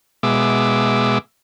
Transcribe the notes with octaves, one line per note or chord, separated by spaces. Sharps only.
B2 G#3 E5 D6